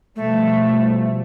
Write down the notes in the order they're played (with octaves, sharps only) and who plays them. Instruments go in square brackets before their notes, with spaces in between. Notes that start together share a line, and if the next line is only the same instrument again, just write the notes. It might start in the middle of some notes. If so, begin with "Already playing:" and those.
[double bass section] B2 F3 G3 [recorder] A3